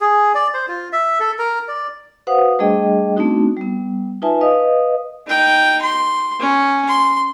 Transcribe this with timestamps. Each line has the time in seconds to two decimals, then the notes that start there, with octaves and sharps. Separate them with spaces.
0.01 G#4
0.34 D5
0.54 C5
0.68 F4
0.93 E5
1.20 A4
1.39 A#4
1.68 D5
2.27 F#4 B4 C5 F5 F#5 D#6
2.59 G3 A3 D4 G#4 D#5 G5
3.16 A3 B3 C4 D4 D#4 F#4
3.57 G3 B3
4.22 D#4 F4 B4 E5 G#5 A5
4.41 B4 D#5 F5 D#6
5.27 D#4 G5
5.82 C6
6.40 C#4
6.88 C6